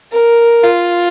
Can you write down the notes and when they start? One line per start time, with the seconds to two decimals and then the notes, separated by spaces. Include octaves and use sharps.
0.12 A#4
0.64 F4